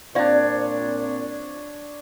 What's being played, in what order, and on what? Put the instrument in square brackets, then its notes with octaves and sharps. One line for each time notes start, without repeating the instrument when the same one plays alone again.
[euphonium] A#2 [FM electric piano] C4 F4 [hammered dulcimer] D4 C#5 [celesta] D5 F5